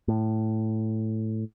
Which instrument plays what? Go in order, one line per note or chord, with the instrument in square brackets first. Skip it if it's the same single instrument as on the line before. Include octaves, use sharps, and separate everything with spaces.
[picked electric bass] A2